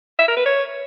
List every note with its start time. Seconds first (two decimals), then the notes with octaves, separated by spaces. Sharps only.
0.19 E5
0.28 A#4
0.37 B4
0.46 C#5